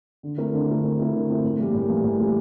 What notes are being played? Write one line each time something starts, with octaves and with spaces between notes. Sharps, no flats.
D3
A3 C4 E4 A#4
D3
A3 C4 E4 A#4
D3
A3 C4 E4 A#4
D3
A3 C4 E4 A#4
A2
E3 G3 A#3
A2
E3 G3 A#3
A2
E3 G3 A#3